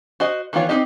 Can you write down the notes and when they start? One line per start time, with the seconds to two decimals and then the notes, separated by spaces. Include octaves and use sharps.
0.20 F#4 C5 D#5
0.53 D#3 E3 B3 F4 C#5
0.69 C4 D4 D#4 G4 D#5